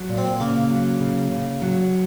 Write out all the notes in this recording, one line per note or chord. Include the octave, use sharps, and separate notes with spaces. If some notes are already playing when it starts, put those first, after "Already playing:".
Already playing: F#3
A#2
C4
C#3 A#3
F#3
C#3
C#3
F#3